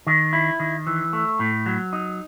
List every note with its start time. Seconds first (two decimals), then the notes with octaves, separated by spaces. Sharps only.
0.07 D#3
0.33 E4
0.60 D#3
0.87 E3
1.13 A3
1.39 A2
1.66 F#3
1.93 D#4